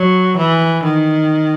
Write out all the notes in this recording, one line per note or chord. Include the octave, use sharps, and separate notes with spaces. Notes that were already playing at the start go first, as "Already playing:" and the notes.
Already playing: F#3
E3
D#3